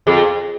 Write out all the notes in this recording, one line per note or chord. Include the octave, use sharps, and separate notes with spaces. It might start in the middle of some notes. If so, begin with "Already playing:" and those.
F2 G#4